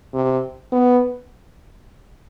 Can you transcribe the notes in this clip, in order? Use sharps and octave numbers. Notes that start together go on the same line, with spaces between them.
C3
B3